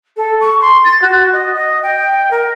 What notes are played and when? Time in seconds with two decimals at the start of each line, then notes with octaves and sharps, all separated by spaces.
0.16 A4
0.40 C#6
0.61 C6
0.84 A6
1.01 F#4
1.32 D#5
1.54 D#5
1.83 G5
2.30 A#4